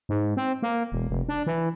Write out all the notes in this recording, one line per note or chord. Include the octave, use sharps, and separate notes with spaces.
G#2
C4
A#3
E1
F1
D4
E3